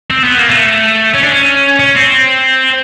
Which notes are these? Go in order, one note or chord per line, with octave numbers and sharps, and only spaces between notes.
C4
B3
A#3
A3
C#4
D4
C#4
C#4
C4